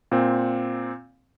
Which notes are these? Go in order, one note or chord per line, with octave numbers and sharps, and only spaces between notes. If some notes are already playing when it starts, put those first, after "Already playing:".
A#2 C4